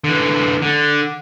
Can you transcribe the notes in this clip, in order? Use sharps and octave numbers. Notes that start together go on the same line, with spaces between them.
D3 E3
D3